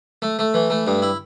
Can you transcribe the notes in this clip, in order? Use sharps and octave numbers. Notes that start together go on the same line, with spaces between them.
A3
A3
E3
A3
G2
E4